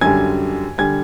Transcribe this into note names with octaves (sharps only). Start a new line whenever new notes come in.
F#2 D3 G3 G#5 G#6
D3 G3 G#5 G#6